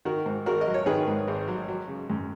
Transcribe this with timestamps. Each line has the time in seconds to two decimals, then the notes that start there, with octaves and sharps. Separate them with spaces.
0.05 D#3 F#4 A#4
0.26 G#2
0.46 G#1 F#4 A#4
0.61 D#5
0.67 F#3
0.74 C#5
0.86 D#3 G#4 B4
1.08 G#2
1.28 G#1
1.48 F#3
1.68 F#3
1.88 C#3
2.10 F#2